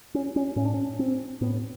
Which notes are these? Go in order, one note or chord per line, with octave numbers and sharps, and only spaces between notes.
C#4
C#4
A2 C#4
D4
C#4
C4
A2 B3